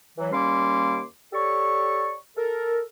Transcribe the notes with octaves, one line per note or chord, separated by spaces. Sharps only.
E3 F#3
D#2 G3 A#3 C#4 C6 D6
G4 A4 C#5 D5 C#6
A4 A#4